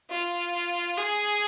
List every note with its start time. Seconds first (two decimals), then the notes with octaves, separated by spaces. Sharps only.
0.10 F4
0.97 G#4